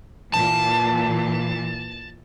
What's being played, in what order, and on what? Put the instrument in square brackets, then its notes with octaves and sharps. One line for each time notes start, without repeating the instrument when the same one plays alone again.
[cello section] A#2 E3 [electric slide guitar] A5